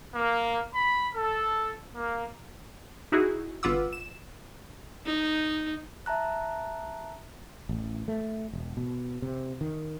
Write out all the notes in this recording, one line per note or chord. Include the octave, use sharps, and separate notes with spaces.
A#3
B5
A4
A#3
D#4 E4 F#4 G#4
G1 F4 B4 F#5 D6 E6
E7
D#4
E5 A5 A#5 F#6
A1
A3
E1
B2
C3
D#3